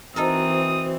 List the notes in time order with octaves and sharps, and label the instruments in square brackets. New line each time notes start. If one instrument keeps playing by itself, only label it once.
[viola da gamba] E3 C4 [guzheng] D#4 A4 A#4 [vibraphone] F#4 C5 [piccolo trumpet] D#6